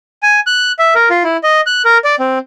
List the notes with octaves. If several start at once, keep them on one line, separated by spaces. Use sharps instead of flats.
G#5
F#6
E5
A#4
F4
E4
D#5
F#6
A#4
D5
C4